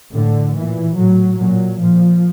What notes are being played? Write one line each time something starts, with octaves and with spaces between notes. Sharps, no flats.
A2 D3
A#2 E3
A2 F#3
A#2 F#3
A#2 F3